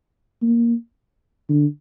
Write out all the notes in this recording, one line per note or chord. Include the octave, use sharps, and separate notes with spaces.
A#3
D3